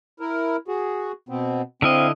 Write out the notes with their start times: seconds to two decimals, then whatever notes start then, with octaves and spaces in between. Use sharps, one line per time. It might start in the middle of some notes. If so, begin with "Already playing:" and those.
0.20 E4 A#4
0.68 F#4 G#4
1.29 B2 B3 C4
1.82 D3 C4 E4 D#5 F5